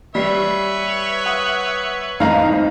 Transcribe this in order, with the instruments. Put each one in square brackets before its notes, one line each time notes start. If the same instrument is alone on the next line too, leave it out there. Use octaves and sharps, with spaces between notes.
[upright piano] G3 [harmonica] B4 C#5 E5 [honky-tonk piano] B6 C7
[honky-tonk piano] F#5 D#6 F#6
[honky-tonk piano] G#1 F2 A2 [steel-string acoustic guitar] D#4 [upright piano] F5 A#5